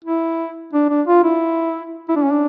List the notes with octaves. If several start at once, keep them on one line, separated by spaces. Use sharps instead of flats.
E4
D4
D4
F4
E4
E4
D4
C#4
D4